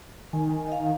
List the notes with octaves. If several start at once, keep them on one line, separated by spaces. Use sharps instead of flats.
D#3 G#5
D#5 F5